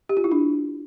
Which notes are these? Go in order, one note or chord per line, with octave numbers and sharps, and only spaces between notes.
G4
F4
E4
D4